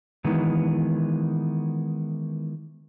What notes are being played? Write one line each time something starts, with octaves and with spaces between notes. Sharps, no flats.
D#3 E3 G#3 B3